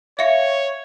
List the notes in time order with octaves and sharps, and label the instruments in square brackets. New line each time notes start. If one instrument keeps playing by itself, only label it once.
[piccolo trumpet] C#5 [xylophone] E5 F5 C#7